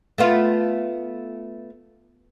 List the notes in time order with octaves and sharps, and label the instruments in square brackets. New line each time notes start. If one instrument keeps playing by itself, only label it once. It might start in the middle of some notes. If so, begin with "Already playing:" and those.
[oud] A3 B3 F4